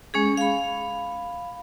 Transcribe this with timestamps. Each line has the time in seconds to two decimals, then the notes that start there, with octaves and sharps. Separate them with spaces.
0.14 G#3 C#4 G#4
0.37 F5 B5